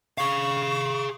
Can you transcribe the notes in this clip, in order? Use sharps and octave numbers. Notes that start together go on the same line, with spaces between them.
G#4 F5 C#6